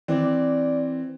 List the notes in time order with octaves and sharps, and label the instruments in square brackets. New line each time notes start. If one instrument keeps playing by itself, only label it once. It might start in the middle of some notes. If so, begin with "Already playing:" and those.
[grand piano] E3 C4 [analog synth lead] D5